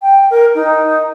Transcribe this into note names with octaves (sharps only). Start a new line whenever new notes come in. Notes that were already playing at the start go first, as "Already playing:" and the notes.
G5
A#4
D#4